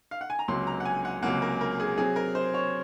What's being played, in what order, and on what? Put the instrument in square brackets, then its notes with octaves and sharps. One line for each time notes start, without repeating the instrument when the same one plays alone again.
[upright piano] F5
F#5
G#5
A#5
[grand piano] C#2 C3 F#3 A#3 [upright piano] C6
[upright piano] A#5
F#5
G#5
F#5
[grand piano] C#2 C3 F#3 A#3 [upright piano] F#5
[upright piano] A#4
A#4
G#4
[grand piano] C3 F#3 C4 [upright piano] G#4
[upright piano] A#4
C5
C#5